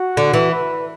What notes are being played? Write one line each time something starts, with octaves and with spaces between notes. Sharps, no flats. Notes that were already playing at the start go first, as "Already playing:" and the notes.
Already playing: F#4
D3
E3
B4